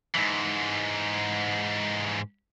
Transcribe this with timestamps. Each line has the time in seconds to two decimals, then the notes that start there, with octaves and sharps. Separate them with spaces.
0.15 G#2 E3